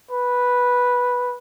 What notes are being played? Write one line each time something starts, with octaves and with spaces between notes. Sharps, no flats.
B4